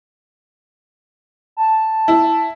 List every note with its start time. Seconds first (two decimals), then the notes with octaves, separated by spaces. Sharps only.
1.57 A5
2.08 E4